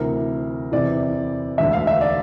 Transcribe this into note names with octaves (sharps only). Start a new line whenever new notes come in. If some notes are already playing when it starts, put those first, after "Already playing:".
Already playing: D2 C3 E3 A#4
E2 C3 E3 D5
E1 D2 D3 E5
F5
E5
D5